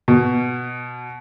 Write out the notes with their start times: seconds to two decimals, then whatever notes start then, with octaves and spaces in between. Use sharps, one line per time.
0.08 B2